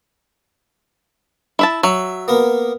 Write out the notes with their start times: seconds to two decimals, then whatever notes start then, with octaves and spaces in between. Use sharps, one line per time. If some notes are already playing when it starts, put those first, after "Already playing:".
1.59 E4 E5 A5
1.83 F#3 E5
2.28 A#3 B3 A#4